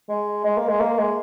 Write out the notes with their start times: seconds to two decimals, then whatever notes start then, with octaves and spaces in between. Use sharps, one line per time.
0.09 G#3
0.44 G#3
0.57 A#3
0.68 G#3
0.80 A#3
0.98 G#3